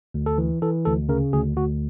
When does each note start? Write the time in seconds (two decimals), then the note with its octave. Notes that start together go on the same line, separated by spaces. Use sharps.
0.14 D2
0.26 A4
0.38 E3
0.62 E3 A4
0.85 D2 A4
1.09 C#3 A#4
1.33 D2 G#4
1.57 D2 F#4